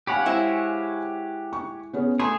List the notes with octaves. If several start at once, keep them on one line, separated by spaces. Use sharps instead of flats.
G4 C#5 F5 F#5 G#5 B5
G#3 E4 C5
C#6
B3 C#4 G#4
A3 G#4 C6